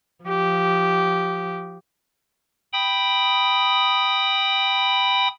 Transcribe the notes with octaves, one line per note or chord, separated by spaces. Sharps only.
F3 G4
G5 B5 D#6